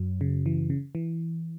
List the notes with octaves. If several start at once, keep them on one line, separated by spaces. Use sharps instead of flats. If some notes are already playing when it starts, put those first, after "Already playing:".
Already playing: F#2 F#3
C#3
E3
C#3
E3